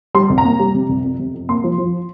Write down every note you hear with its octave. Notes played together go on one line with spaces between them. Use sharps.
G3 C6
C2
A#5
A#3
G3
C3
C2
F2
C3
F2
A#3 C6
F3
F3